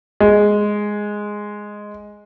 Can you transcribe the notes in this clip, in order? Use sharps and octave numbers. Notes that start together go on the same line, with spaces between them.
G#3